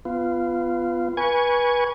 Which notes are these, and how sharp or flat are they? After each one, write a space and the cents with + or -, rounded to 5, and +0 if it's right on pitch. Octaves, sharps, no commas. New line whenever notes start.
B3 +15 F4 -15
B4 -25 G#5 -10 C#6 +10